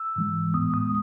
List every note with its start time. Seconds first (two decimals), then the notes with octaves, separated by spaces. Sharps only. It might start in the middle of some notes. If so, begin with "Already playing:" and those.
Already playing: E6
0.16 G#2 E3 G#3
0.54 A2 G#3 B3 D#6
0.74 D#6